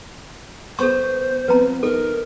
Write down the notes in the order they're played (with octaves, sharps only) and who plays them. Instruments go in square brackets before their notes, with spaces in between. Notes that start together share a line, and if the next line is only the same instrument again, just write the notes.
[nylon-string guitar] B3 [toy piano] A4 C#6 [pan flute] C5
[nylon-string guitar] F3 B3 C4 [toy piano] B4 A#5
[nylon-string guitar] D#4 [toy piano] A4 [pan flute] A#4